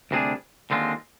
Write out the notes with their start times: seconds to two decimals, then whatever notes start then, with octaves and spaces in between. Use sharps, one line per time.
0.11 D2 C3 G3 D4 G#4
0.71 D#2 D3 G#3 C4 F4